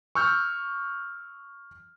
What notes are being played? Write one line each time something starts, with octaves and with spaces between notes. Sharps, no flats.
C#6 E6 F6 G6